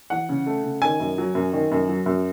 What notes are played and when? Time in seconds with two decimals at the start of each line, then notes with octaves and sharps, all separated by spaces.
0.10 E3 F#5
0.29 C#3
0.46 A3
0.64 C#3
0.82 D#3 G#5
1.00 F#2
1.18 F#3
1.35 F#2
1.53 D#3
1.71 F#2
1.88 F#3
2.06 F#2